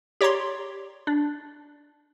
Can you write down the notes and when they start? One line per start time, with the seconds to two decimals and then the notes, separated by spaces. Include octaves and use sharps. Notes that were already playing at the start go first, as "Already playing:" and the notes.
0.21 G4 C#5 D5 A#5 C6
1.07 D4